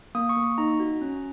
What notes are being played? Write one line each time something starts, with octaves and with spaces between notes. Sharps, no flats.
A#3 D#6
C#6
A#3
C#6
D#4 A#5
F#4
C#4